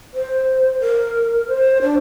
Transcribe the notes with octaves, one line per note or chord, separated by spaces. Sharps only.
C5
A#4
C5
D4